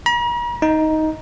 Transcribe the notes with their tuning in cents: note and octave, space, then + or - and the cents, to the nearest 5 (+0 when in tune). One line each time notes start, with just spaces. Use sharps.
A#5 +45
D#4 +10